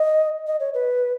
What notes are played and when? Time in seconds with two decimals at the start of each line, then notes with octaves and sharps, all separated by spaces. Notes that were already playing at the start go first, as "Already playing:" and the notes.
Already playing: D#5
0.47 D#5
0.60 C#5
0.74 B4